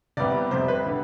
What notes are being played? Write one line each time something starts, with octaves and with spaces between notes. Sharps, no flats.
C2 C3 G3 B3 D5
F2 C3 G3 C5
B4
D3 G3 B3